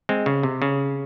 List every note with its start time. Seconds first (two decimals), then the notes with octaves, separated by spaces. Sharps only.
0.09 G#3 C4
0.26 C#3
0.43 C3
0.62 C#3